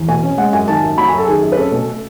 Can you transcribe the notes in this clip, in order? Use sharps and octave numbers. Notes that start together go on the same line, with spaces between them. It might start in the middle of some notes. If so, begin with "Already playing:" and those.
Already playing: E2
B2 G#5
C#4
G#3 F#5
F#2 G#5
D#3 A5
F#2
F#3 B5
F#2 G#5
A4
D#3 G#4
F#2
B4
C#4 A4
B2
A3